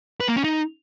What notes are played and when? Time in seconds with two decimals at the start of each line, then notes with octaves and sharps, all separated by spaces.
0.20 B4
0.28 A#3
0.36 C#4
0.44 D#4